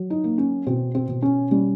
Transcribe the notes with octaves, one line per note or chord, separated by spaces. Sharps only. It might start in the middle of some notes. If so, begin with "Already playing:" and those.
Already playing: F#3
D#4
A#3
C#4
B2 C4
C4
B2
C#4
G3 C#4